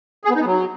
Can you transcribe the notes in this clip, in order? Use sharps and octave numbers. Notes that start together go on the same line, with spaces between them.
G#4
B3
D#4
B3
F#3